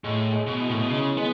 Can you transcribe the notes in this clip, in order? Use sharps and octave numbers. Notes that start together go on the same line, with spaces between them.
A2 G#3
G#3
B2
E4
A2
B2
C#3 G#3
G#3 B3